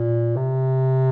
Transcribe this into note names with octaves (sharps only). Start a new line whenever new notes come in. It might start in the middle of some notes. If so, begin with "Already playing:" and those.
Already playing: A#2
C3